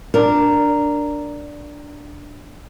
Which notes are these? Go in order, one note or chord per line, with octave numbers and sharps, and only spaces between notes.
D4 A#4